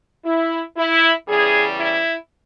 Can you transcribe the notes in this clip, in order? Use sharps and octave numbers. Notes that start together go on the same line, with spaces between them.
E4
E4
E2 C#3 E3 G3 G#4
E4